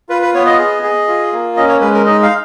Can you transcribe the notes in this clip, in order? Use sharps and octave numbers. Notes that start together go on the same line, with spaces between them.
F4 B4
B4
B3 C#5
D#5
G#4
G#4
F4
A#3
C#4 D#5
C#5
G#3 B4
A#4
D#4 D#5
F5